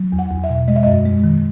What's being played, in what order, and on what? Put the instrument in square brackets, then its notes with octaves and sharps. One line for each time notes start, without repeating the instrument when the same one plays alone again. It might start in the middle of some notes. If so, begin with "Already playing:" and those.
Already playing: [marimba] F#3
E2
F#5
E2
E5
B2
G#3 D#5
E5
F#2 D#5
G#3
D#3